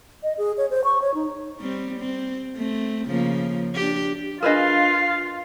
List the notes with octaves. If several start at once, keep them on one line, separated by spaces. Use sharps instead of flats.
D#5
G#4
C#5
C5
C#6
C#5
D#4
G3 C4
C4
A3 C4
C#3 F3 A#3
D4 G4
D4 F4 G#4 A#4 B4 D#5 F5